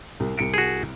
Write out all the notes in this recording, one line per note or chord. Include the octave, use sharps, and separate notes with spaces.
C2
C2 C#7 D7
F#4 G#4